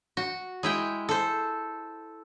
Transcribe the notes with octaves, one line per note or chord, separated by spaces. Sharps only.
F#4
G#3 E4 G5
A4 C5